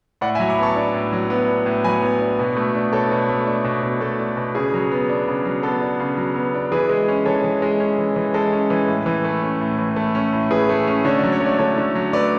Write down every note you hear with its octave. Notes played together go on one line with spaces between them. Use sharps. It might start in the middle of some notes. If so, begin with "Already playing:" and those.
A2 D5 F#5
E5 G#5
F#3
B5 D6
B3 A5 C#6
D4
A2
F#3
B3
D4
A2
F#3 G#5 B5
B3
D4
B2
A3
D4
B2 A4 C#5
B2
A3
D4
B2
B2
A3 A4
D4
B2
C#3 G#4
F#3
B3
D4
C#3
F#3
B3 A4
D4
C#3
F#3
B3
D4
E3 G#4 B4
G#3
C#4
E3 A4 C#5
E3
G#3
C#4
E3
E3
G#3 A4
C#4
E3
A2
E3
A3
C#4
A2
E3
A3
C#4
A2
E3 G#4 B4
A3
C#4
D3 C#5
D5
F#3
C#5
A3 D5
D3 A4 C#5
D3
F#3
A3 B4 D5